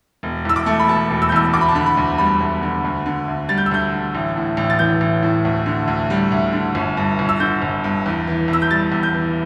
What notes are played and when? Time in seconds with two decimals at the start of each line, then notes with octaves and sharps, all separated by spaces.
0.23 E1
0.45 E2 E6
0.56 D6
0.66 A3
0.79 B5
0.88 B2 A5
1.10 E1
1.22 E6
1.29 G6
1.32 E2 E6
1.54 D2 D6
1.61 B5
1.69 A5
1.75 D3 B5
1.86 B5
1.97 D2
2.18 G3 B5
2.40 D2
2.63 D3
2.85 D2
3.06 D3
3.28 D2
3.49 G3 A6
3.58 G6
3.66 E6
3.71 D2 G6
3.92 D3
4.15 A1
4.37 A2
4.57 A1
4.70 A6
4.79 E3 G6
5.01 A1
5.23 A2
5.45 D2
5.66 D3
5.88 D2
6.10 G3
6.32 D2
6.53 D3
6.75 G1
6.97 G2
7.19 G1
7.29 E6
7.40 D3 G6
7.62 G1
7.84 G2
8.06 E2
8.27 E3
8.48 E2
8.53 E6
8.62 G6
8.71 G3 A6
8.92 E2
9.03 G6
9.14 E3